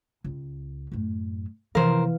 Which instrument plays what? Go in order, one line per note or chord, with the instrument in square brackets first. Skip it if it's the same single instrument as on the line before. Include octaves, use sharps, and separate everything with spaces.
[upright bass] C#2
F#2 A2
[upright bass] C3 F3 [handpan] E3 F5 [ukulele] A#4 C5